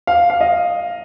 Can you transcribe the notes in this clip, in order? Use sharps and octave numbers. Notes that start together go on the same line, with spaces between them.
F5
F5
D#5